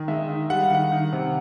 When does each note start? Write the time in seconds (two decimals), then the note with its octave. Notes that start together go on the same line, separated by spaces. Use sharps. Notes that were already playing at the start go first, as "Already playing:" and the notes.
Already playing: D#3
0.08 G#3 E5
0.29 D#3
0.50 G3 F#5
0.62 F5
0.70 D#3 F#5
0.92 D#3
1.13 C3